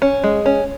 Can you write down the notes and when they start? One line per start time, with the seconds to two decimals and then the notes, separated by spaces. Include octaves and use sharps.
0.02 C#4
0.24 G#3
0.46 C#4